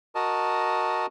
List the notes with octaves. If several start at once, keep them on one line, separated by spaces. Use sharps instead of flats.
F#4 A#4 D#5 A5